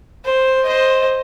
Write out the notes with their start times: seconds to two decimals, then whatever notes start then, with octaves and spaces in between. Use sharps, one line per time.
0.25 C5
0.65 C5 D#5